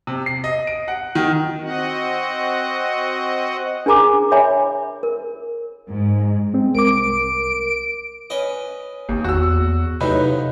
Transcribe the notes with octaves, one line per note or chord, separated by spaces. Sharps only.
C3
C7
D#5
D7
F#5
D#3
C4 F#4 D#5 F#5
D4 G#4 A#4 G#5 A#5 D6
C#5 E5 G#5 B5
A#4
G#2
G#3 C4
C2 A#4 D6 D7
C#4 B4 D#5
G#1 D#2
E2 F#4 E6
A2 C3 F3 F#3 D#4 B4